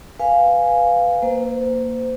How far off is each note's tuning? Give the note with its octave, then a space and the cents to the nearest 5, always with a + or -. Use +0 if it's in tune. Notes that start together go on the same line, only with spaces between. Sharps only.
B4 +0 F5 +0 G#5 +0
A#3 +0 C5 -30